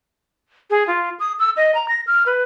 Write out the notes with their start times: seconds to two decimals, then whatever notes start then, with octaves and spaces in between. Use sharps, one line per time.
0.70 G#4
0.87 F4
1.20 D#6
1.39 E6
1.57 D#5
1.75 A#5
1.88 A#6
2.07 F6
2.26 B4